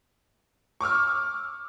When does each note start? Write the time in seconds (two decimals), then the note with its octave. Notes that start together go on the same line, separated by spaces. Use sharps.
0.81 C#6 D6 E6 F6